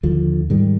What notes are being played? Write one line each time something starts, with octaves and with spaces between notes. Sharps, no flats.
D#2 D3 F3
G#2 D#3 G3